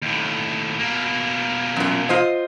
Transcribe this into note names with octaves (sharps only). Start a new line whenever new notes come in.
D#2 A2
B2 A#3
F#2 A#2
F4 C5 D#5